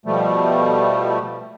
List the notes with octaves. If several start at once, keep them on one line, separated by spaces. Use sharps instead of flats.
B2 F3 G3 A3